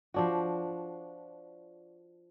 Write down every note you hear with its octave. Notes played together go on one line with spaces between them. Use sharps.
F3 D4 F#4